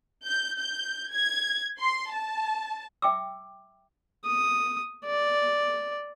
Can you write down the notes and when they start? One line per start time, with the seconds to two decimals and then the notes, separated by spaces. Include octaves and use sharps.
0.25 G6
0.58 G6
1.11 G#6
1.80 C6
2.12 A5
3.02 E5 G5 D6 E6
4.25 D#6
5.05 D5